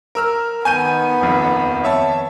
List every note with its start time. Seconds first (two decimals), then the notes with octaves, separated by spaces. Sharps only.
0.15 A#4 E6 F6
0.65 D#3 B3 G#5 G6 D#7
1.21 D#1 F2
1.84 C#5 E5 A5